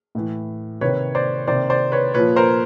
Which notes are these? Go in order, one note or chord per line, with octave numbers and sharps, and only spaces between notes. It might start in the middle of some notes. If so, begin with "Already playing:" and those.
A2 E3
C3 D#3 B4 C#5
C5 D5
C3 D#3 C5 D5
C5 D5
B4 C#5
A#2 F3 B4 C#5
A#4 C5